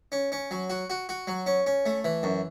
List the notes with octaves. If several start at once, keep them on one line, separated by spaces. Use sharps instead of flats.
C#4
C#4
F#3
F#4
F#4
F#4
F#3
C#4
C#4
A3
E3
F#2